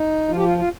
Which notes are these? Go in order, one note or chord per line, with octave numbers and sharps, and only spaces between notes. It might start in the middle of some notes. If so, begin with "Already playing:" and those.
Already playing: D#4
F3 F4
G4
F4
F4